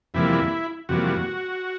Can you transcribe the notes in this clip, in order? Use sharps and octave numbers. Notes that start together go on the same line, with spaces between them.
F2 C3 E3 G3 A#3 E4
F2 C3 E3 G3 A#3 F#4